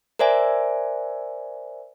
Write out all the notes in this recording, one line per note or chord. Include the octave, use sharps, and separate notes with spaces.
A#4 C5 D5 E5 G#5